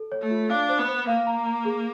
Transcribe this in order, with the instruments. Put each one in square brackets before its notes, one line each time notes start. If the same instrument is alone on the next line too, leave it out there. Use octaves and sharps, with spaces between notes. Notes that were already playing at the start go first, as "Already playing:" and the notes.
Already playing: [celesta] A4
C#5
[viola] A3
[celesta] F4
[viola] D4 [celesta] F5
[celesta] C5
[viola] B3
[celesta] C5
[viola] A#3 [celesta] F5
[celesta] A#5
A#5
G#4